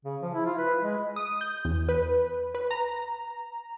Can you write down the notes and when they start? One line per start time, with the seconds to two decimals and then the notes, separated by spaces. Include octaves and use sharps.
0.05 C#3
0.22 F3
0.34 E4
0.46 F4
0.58 B4
0.83 G#3
1.16 D#6
1.41 G6
1.65 E2
1.89 B4
2.55 B4
2.71 A#5